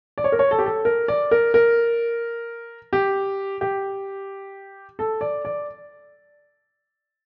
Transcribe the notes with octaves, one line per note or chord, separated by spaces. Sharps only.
D5
C#5
A#4
C#5
A4
G4
A4
A#4
D5
A#4
A#4
G4
G4
A4
D5
D5